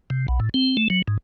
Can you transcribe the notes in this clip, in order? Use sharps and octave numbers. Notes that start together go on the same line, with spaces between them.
C3
B1
A2
C4
A3
F#3
G#2